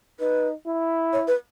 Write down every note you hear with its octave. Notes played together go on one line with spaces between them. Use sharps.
D#4 B4
E4
C#5
B4